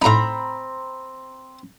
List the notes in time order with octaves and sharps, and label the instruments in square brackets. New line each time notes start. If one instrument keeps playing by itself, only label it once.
[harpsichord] A2 D#4 [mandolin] C4 A#5 B5